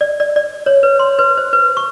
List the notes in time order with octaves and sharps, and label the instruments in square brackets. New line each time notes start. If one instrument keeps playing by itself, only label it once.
[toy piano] D5
D5
D5
C#5
B4
C6
B4
C5
B4
C#6